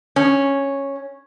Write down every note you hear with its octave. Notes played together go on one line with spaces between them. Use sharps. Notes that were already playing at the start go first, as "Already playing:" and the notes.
C#4